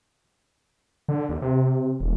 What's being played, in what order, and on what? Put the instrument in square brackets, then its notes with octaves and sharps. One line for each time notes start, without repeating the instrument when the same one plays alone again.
[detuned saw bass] D3
D#2
C3
E1